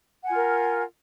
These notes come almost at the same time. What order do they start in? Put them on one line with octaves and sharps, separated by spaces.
F#5 G#5 F4 A#4